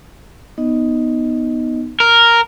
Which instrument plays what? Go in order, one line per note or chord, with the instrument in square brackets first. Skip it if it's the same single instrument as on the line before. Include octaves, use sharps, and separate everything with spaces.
[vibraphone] B3 D#4 D#5
[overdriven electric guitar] A#4